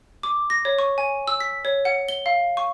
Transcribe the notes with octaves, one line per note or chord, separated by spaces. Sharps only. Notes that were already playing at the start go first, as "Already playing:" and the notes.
D6
A#6
C#5
C#6
G#5
E6
B6
C#5
F#5
G7
F5
C#6